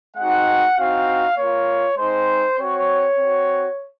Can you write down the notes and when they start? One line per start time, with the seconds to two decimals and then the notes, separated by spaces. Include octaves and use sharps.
0.17 G#3 C4 D#4 F#4 F#5
0.77 C4 D#4 F#4 F5
1.38 A#3 F4 C#5
1.98 G#3 C4 D#4 C5
2.59 C4 F#4 C#5
3.19 C4 F#4